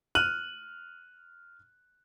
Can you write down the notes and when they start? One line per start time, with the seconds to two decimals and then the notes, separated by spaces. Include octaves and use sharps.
0.15 F6 F#6 D#7 F#7